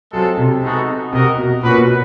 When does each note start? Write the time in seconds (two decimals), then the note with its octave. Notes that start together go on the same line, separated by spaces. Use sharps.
0.13 F#3 G#3 C4 F4 A4
0.37 C3
0.63 G#3 B3 D#4 F#4 A4
1.13 C3 F#4 A#4 D#5
1.38 B2
1.63 A#2 C#4 F#4 B4
1.76 B2